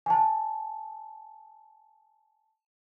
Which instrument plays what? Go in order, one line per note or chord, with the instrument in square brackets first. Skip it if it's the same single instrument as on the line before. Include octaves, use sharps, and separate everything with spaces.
[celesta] G#5 A5